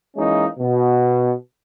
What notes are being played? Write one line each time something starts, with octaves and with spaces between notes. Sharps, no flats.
E3 G#3 A#3 C#4 D#4
B2